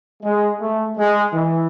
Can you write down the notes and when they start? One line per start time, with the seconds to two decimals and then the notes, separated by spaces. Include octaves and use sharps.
0.23 G#3
0.60 A3
0.97 G#3
1.33 E3